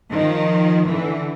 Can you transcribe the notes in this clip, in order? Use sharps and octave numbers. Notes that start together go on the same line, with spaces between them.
D#3 F3
D3 E3